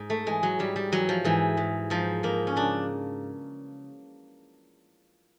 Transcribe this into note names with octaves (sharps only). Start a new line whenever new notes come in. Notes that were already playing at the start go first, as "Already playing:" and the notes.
Already playing: G#2
A3
E3 G#3
F#3
G#2 G3
G3
E3 F#3
F3
G#2 E3
G#2
G#2 F3
G#2 A#3
C#4
C#3 D4